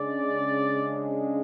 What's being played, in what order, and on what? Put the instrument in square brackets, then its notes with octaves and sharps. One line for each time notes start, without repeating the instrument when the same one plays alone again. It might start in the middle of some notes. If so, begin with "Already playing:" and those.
Already playing: [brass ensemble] C#3 G#3 D4 D5